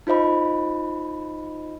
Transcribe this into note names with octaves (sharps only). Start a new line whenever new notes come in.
D#4 F4 C5 D#5 B5